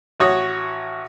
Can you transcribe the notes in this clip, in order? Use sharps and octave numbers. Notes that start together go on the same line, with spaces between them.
A1 F#4 C#5 D#6